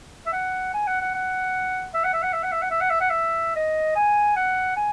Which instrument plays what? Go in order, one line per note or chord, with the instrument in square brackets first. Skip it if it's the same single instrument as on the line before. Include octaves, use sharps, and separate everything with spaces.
[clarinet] E5
F#5
G#5
F#5
F#5
F#5
E5
F#5
E5
F#5
E5
F#5
E5
F#5
E5
F#5
E5
F#5
E5
D#5
G#5
F#5
G#5